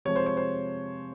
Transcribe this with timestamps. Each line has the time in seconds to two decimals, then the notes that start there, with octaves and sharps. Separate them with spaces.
0.05 C3 F3 G#3 C#5
0.16 C5
0.26 C#5
0.37 C5